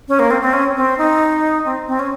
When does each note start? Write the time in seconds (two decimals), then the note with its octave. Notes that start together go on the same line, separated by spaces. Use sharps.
0.08 C#4
0.19 A#3
0.31 C4
0.41 C4
0.53 C#4
0.76 C4
0.98 D#4
1.65 C4
1.88 C4
1.99 C#4